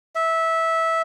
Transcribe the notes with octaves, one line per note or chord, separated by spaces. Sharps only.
E5